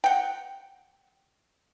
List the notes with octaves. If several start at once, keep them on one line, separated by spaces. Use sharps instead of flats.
F#5 G5